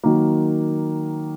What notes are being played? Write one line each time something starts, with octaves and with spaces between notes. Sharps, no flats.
D#3 F#3 A#3